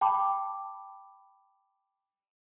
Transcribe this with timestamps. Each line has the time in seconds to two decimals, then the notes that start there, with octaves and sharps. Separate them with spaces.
0.01 G5 A5 B5 D6